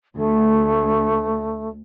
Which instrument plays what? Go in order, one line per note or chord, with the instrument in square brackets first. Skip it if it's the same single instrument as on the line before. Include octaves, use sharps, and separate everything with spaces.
[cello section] D2 [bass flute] A3